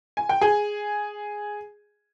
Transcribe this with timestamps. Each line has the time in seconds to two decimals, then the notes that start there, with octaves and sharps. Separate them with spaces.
0.17 G#5
0.29 G5
0.41 G#4 G#5